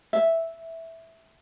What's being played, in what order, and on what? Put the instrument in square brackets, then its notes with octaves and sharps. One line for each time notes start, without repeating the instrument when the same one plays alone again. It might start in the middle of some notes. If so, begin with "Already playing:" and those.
[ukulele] E5